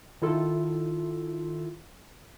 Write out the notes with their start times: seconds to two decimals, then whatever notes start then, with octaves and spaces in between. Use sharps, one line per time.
0.22 D#3 E4 F4 A4